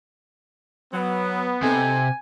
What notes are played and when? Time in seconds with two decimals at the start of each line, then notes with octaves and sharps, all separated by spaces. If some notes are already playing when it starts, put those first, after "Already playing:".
0.93 F#3 B3
1.63 C3 D#4 A4 G#5